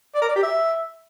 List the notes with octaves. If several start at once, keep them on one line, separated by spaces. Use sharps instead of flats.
D5
A#4
D5
G4
E5